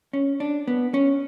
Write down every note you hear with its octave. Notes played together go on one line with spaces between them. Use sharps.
C#4
D4
B3
C#4